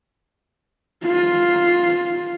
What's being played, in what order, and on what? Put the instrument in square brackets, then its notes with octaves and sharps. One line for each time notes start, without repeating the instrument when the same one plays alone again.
[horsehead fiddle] F4